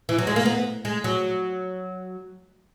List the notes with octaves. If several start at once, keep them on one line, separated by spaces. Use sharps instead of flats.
E3
F#3
G#3
A#3
B3
G#3
F#3